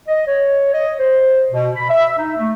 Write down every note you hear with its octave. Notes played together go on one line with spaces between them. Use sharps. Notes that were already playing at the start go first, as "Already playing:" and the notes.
D#5
C#5
D#5
C5
B2
B5
E5
D#4
A3